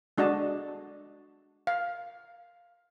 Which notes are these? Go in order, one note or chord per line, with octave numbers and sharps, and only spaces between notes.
G#3 D4 F#4 D#5 A5
F5